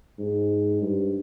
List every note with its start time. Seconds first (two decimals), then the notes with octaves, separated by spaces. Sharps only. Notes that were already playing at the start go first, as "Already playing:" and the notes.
0.19 G#2
0.82 G2